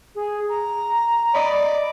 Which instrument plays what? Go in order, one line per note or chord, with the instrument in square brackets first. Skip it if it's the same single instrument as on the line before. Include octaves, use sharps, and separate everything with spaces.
[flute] G#4
A#5
[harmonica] D5 [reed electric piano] D#5 B5